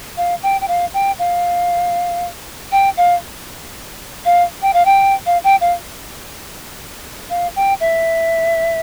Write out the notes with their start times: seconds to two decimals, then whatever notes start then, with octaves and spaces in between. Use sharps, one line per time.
0.17 F5
0.43 G5
0.61 G5
0.68 F5
0.94 G5
1.19 F5
2.72 G5
2.97 F5
4.25 F5
4.62 G5
4.73 F5
4.85 G5
5.26 F5
5.44 G5
5.61 F5
7.30 F5
7.56 G5
7.80 E5